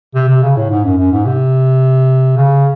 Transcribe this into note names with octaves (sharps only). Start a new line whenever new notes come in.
C3
C3
C#3
A2
G#2
F#2
F#2
G#2
C3
C#3